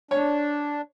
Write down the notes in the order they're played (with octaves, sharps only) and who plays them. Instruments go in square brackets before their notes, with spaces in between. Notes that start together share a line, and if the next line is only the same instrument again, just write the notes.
[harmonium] D4 [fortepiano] C#5